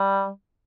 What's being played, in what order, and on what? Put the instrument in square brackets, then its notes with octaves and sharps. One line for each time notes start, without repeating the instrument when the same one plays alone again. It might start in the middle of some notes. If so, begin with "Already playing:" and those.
Already playing: [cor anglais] G3